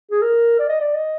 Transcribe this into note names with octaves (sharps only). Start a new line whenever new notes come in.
G#4
A#4
D5
D#5
D5
D#5